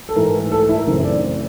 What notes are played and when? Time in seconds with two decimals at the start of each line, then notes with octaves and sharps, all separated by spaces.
0.09 A4
0.16 G#2 E3 A3 A#4
0.52 A4
0.69 E4
0.78 A#4
0.87 F#2 C#3 E3 A3 C4
1.04 D5
1.22 C5